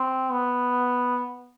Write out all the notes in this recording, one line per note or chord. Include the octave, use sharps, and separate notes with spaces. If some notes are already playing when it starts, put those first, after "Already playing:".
Already playing: C4
B3